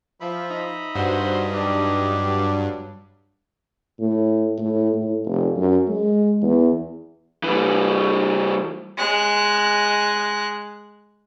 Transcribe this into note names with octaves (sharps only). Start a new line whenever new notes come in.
F3 E5 B5
D#4
G2 F#4 C5
F#3 G3 D4 G4
A2
A2
A2
F1
F#2
G#3
E2
E3 G3
G#3 F#6